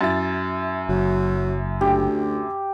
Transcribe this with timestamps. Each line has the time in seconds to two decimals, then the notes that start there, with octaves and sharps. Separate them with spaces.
0.01 F#2 E4 A6
0.89 F#1 F#3
1.81 D2 G4